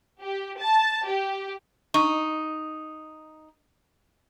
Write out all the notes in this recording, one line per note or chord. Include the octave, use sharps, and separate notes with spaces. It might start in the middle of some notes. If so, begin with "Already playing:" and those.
G4
A5
G4
D#4 C#6